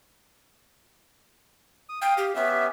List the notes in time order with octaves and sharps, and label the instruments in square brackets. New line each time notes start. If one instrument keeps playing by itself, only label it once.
[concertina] D#6
[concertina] F5 D#6 [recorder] G5
[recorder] G4
[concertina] B3 C#4 G4 [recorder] E5